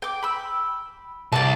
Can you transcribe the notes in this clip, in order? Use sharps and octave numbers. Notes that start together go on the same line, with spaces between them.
G5 D6
B5 E6
C2 D5 A5